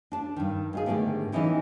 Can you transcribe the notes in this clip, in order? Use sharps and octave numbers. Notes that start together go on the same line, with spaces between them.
D4 A5
G2 D#3
G#2 F4 G#4
G#2 D3 D#3 A3 B3 G4
E3 B3 C#4 D#4 E4 G4